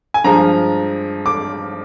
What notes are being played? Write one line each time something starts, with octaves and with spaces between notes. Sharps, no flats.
G#5
G2 F3 G#3 A#5
D6